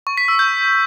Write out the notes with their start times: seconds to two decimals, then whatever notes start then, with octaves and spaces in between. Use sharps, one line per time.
0.07 C#6
0.17 B6
0.28 E6
0.39 G6